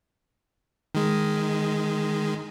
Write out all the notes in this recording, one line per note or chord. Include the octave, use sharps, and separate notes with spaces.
D#3 G#3